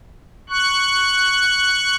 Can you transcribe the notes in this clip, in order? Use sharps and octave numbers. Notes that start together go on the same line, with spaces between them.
C#6 F#6